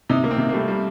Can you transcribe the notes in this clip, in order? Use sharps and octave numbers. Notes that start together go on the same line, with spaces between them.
C3 D#4
C3 A#3
C4
C3
A#3
G3 A3
G3